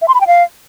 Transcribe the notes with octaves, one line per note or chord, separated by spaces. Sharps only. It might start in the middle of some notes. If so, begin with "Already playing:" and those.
E5
C6
B5
G5
F5